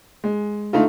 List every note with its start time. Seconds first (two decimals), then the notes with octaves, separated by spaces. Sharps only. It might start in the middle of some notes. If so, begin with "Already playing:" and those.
0.24 G#3
0.73 D3 A3 D#4 F4